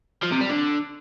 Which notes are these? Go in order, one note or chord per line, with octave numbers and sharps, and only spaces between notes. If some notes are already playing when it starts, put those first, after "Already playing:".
F3
C3
G3
D3